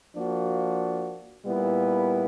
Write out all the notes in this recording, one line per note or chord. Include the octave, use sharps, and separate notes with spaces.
F3 A#3 D4 F#4
A#2 G3 B3 E4